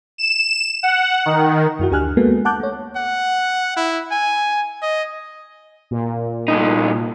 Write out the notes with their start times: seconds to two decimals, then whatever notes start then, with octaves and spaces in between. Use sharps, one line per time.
0.18 E7
0.83 F#5
1.26 D#3
1.79 F#2 E4 F#4
1.91 D2 D4 G4 G#5 F6 F#6
2.17 G#3 A#3 B3 F#4 A4
2.45 F#5 A5 D6 F#6 G6
2.60 A3 C#5
2.96 F#5
3.77 E4
4.12 G#5
4.83 D#5
5.91 A#2
6.48 C2 D#4